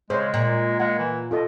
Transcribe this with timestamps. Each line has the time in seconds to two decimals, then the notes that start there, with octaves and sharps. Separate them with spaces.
0.10 C#3 G#3 C5 C#5
0.34 A#2
0.79 G#3 F5 F#5
0.99 E3
1.31 B2 F4 A4 D#5